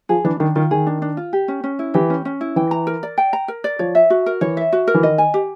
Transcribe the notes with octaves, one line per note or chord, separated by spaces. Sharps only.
F3 G#4
E3 D4
D#3 D4
D#3 F4
D#3 G#4
D4
D4
F4
G4
C#4
C#4
E4
E3 G4
C#4
C#4
E4
E3 G5
A#5
A#4
D5
G5
A#5
A#4
D5
F3 C#5
E5
F#4
A#4
E3 C#5
E5
F#4
A#4
E3
D#3 D#5
G#5
G4